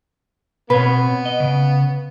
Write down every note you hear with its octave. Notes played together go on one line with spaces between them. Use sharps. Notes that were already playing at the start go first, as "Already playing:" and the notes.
B2 B3 C4 B4 C#5
D#5
C#3